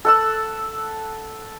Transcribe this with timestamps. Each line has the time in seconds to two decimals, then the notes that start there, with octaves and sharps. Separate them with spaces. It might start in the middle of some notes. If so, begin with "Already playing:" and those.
0.05 A4 F#5 E6